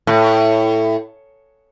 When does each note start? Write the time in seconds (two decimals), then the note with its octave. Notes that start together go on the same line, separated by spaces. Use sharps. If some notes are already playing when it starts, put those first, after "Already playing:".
0.07 A2